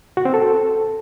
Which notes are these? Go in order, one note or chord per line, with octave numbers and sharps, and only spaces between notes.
F#4
C4
A4